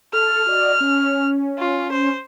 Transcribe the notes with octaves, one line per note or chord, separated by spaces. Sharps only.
A4 A5 F6
F#4 D5 D#5
C#4
F4
C5